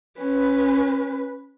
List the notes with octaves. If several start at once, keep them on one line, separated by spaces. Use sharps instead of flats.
C#4 B4